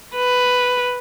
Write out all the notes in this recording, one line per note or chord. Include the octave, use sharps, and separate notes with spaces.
B4